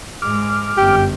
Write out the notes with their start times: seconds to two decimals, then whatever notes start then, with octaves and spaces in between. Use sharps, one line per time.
0.22 G#2 G#3 D6 F6
0.78 G1 F#2 G4